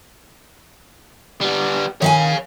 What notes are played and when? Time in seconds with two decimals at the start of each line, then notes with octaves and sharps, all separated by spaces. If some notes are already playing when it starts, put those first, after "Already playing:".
1.41 G3 B3
2.02 D#3 C#5 E5 F5 G#5